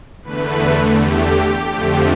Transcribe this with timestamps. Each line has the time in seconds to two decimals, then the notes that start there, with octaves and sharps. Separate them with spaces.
0.22 E2 D3 A3 B4
0.96 G4
1.69 F2 D3 F3 A3